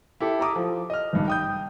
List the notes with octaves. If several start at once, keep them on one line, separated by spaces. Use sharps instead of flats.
E4 G4 A4
A4 A#5 D6 D#6
F3
D#5 F6
G#1 G2
G5 D#6 G6